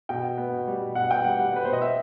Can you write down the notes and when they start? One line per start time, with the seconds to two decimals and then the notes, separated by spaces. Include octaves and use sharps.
0.09 B2 G5
0.23 B2
0.37 B3
0.53 B2
0.67 G3
0.81 B2
0.95 B2 F#5
1.10 B3 G5
1.24 G3 F#5
1.39 G3 F#5
1.53 B3 B4
1.65 B2 C5
1.73 D#5
1.82 E5